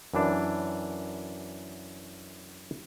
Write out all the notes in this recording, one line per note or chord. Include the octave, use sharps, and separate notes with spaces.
F#2 E3 D4